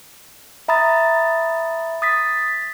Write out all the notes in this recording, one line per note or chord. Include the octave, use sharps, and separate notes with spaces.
E5 A#5 B5 D#6 A6
D#6 A6 B6